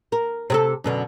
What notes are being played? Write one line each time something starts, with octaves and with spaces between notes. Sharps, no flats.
A#4
C3 G#4 A4
F#2 B2 D3